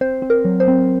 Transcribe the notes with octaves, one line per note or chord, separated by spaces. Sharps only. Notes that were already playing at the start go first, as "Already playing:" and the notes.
C4 C5
C4
A#4
F#3
C5
C4